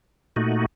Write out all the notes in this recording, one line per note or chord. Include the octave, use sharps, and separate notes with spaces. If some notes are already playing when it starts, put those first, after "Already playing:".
A#2 A3 D#4 F#4